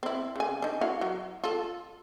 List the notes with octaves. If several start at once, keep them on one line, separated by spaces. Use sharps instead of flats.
C4 E4
C#3 G#5
D4 D#4
E4 F#4 F5
F#3
F4 A4